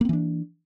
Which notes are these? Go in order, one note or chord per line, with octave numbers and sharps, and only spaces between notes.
E3 A#3 C4 D4